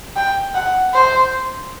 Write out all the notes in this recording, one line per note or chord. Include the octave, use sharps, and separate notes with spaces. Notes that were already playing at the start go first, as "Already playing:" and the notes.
G5
F#5
C5